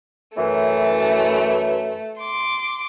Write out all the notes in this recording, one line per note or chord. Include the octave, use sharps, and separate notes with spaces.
F#2 E3 A3
C6 D6